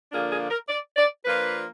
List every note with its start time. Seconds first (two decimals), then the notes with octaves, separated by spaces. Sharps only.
0.12 D3 F3 A#3 D4 F4 G#4
0.31 G#4
0.50 A#4
0.68 D5
0.97 D5
1.25 F3 A#3 D4 F4 B4